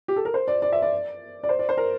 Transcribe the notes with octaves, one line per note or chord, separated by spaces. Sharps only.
G4
A4
A#4
C5
D5
D5
E5
D5
D5
C5
D5
C5
A#4